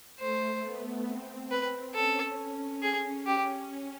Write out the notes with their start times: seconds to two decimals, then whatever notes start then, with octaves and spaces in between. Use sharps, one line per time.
0.19 A3 C5
0.63 B3
1.07 C4
1.51 B4
1.95 C#4 A4
2.82 G#4
3.26 C#4 G4